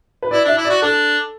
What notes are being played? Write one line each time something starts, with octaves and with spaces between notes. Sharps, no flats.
B4
E4 D5
D4 E5
E4
F#4 D5
D4 A4